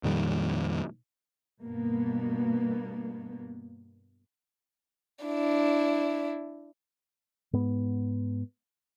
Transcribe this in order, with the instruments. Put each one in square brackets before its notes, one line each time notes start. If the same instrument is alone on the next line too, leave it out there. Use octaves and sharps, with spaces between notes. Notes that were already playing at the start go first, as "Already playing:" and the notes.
[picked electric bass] F2 A#2 D#3 G3
[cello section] G2 B2 A#3 B3
[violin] D4 E4
[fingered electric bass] G#2 B3